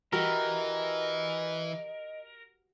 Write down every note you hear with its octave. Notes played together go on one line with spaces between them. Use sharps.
E3 F#4 G4 A#4 B4 D#5